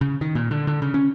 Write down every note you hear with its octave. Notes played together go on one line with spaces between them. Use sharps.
C#3
D#3
A#2
D3
D3
C#3
C#4